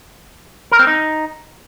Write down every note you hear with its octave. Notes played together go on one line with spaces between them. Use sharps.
A#4
C4
D#4